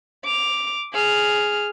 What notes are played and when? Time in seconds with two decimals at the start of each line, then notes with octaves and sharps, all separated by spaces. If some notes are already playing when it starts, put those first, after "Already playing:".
0.24 D6 F7
0.93 G#4 F6